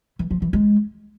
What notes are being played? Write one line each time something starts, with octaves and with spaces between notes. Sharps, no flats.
E3
F3
E3
G#3